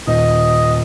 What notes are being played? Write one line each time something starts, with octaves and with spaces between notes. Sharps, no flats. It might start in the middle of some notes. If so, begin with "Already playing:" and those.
D#1 D#5